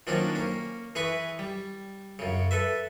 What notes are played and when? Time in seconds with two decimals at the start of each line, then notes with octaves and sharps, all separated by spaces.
0.07 D#3 F3 F#3 A#3 C#4 D4
0.35 A#3 C#4
0.95 E3 G#4 B4 B5 C#6
1.39 G3
2.19 F#2 C#3
2.51 A4 B4 E5